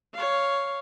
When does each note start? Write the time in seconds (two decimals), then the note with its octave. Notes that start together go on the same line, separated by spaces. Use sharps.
0.14 C#5 F5